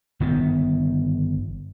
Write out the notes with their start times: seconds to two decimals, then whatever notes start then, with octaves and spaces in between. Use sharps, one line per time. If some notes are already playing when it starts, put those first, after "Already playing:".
0.20 G1 D#3 B3